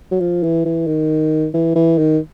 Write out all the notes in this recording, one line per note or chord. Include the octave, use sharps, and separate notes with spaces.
F#3
F3
E3
E3
D#3
E3
E3
D#3